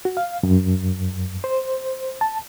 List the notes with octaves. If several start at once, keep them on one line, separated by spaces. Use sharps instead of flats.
F#4
F5
F#2
C5
A5